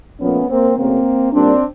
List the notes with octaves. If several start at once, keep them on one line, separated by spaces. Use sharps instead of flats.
A#2 F3 A3 B3 C#4
A#3 C4
F#2 C#3 F#3 A3 A#3 C4
A#2 G3 A#3 C4 D4